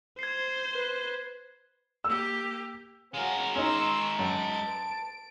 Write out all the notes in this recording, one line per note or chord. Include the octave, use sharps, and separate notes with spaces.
C5 G#6 C7
B4
A#3 G4 E6
G#3 C#4 F#4 A#4 F5
C#4 D#4 A#5 C6 C#6 E6
F#2 A5 D7